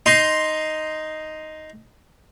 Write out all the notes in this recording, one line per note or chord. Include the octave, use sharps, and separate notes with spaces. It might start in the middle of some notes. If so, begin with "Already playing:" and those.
D#4 C6